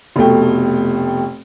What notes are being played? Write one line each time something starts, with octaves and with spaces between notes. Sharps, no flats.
F1 B2 A3 G5